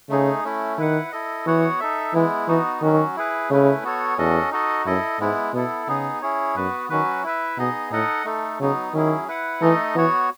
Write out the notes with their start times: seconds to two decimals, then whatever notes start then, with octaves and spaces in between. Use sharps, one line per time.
0.10 C#3 A3 D#4 G#4
0.44 A3 C#4 E4
0.77 D#3 E4 B4 F#5
1.12 E4 A4 D#5
1.46 E3 B3 F#4 C#5 F#5
1.80 D#4 A4 E5
2.14 E3 G#3 B3 E4
2.48 E3 B3 D#4 F#4
2.81 D#3 F#3 C#4 F#4
3.16 E4 G#4 B4
3.50 C#3 A3 C#4 E4 B4
3.84 B3 F#4 A4 C#5
4.18 E2 C#4 F#4 A4 D#5
4.51 D#4 F#4 A4 D#5
4.85 F#2 E4 A4 D#5
5.19 G#2 G#3 B3 E4
5.53 B2 B3 E4 A4
5.87 C#3 B3 D#4 G#4
6.22 C#4 E4 G#4 C#5
6.56 F#2 B3 F#4 B4
6.90 D#3 F#3 C#4 F#4 B4
7.24 E4 B4 E5
7.58 B2 B3 D#4 G#4 D#5
7.91 A2 D#4 A4 D#5 F#5
8.25 A3 D#4 A4
8.60 C#3 F#3 B3 D#4
8.93 D#3 F#3 C#4 E4 G#4
9.28 E4 B4 F#5
9.61 E3 A3 D#4 A4 D#5
9.95 E3 B3 F#4 C#5